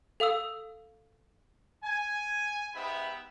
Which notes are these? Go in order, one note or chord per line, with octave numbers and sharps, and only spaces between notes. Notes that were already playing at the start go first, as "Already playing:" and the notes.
A4 F5 D#6 E6
G#5
G#2 B3 G4 E5 B5